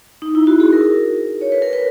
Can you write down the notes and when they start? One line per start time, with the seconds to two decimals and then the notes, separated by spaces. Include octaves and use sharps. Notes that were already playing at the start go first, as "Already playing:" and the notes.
0.22 D#4
0.35 E4
0.47 F#4
0.60 G#4
0.73 A#4
1.41 C#5
1.52 B4
1.62 A#4
1.73 B4